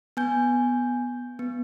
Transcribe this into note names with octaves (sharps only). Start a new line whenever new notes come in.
B3 G#5 G6
B3